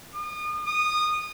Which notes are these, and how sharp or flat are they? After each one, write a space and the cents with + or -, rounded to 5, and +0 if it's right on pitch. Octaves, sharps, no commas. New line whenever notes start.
D#6 -35
D#6 -20